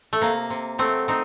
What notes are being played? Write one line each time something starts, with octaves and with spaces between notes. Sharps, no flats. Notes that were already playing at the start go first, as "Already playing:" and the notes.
A3
C3 A#3
C3
F#3 A3 C4
A3 C4 D#4